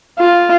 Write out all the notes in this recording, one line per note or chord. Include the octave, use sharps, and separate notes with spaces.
F4